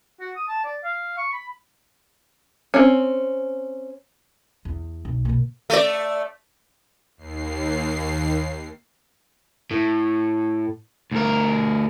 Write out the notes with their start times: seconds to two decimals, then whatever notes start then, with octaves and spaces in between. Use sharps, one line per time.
0.20 F#4
0.36 D#6
0.48 A5
0.64 D5
0.84 F5
1.17 C#6
1.33 B5
2.74 C4 C#4
4.65 E2
5.05 B1
5.25 B2 A#3
5.70 A3 D5
7.18 D#2 C7
9.71 A2
11.11 D2 A#4